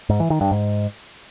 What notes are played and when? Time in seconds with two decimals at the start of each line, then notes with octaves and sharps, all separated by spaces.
0.09 G#2
0.20 E3
0.30 D#3
0.41 G2
0.51 G#2